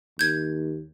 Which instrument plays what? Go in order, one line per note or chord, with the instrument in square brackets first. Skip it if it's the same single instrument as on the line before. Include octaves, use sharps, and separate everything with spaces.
[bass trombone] D#2 [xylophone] G6 G#6